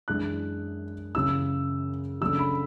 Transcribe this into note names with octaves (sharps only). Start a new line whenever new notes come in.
F#2 E3 G#3 D4 F#6
F#2 C#3 E3 E6
C#3 F#3 A3 D4 E6
B5